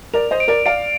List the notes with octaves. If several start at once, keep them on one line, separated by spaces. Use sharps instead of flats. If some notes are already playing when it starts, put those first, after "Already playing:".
A#4 D5 F7
C5 D#5
D7
A#4 D5
D5 F5 D7